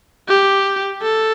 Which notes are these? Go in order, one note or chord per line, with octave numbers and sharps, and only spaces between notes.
G4
A4